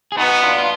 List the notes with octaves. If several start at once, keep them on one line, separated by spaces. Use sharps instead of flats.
G#4
B3 D#4 F#4
D4 F4
F4